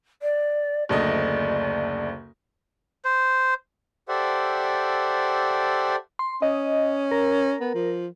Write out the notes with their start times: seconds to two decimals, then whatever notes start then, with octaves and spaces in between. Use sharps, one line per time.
0.22 D5
0.89 F#1 D2 D5 D#5
3.05 C5
4.08 G4 A4 C5 D5 E5 F#5
6.19 C6
6.42 C#4 D#5
7.11 A#4
7.61 B3
7.75 F3